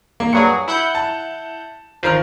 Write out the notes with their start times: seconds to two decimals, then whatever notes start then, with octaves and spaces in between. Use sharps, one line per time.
0.20 A#3
0.33 G2 F#3 G#4 C#7
0.68 E4 F#5 G6
0.95 A5
2.03 G#1 F3 A#4 F6